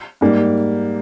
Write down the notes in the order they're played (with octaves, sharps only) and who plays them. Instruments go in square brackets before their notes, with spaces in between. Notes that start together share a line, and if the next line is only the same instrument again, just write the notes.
[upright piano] G#2 G3 A#3